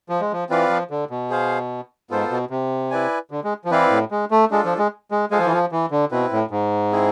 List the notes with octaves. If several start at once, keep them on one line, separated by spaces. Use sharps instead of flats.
F3
G#3
F3
E3 C4 F4 B4 D5 F5
F3
D3
B2
G#4 C5 F5
G#2 B3 F4 A4 C5
B2
C3
E4 B4 D5 G#5
D3
G#3
F3
E3 C4 E4 B4 D5 F5
A2
G#3
A3
G#3 D4 F4 A4
F3
G#3
G#3
G#3 F4 A4 C5 F5 G#5
F3
E3
F3
E3
D3
B2 C4 E4 B4
A2
G#2
C4 E4 G#4